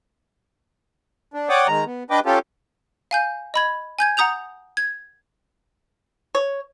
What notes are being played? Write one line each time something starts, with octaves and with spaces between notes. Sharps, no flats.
D4
C#5 D5 F#5 G5 D6 D#6
D#3 G#3 A#5
B3
D4 B4 D#5 G5 D6
C#4 F4 G4 A4
F5 G#5 G6
D#5 B5 G#6
G#5 G6 G#6
F#5 A#5 D#6 G6 F7
G#6
C#5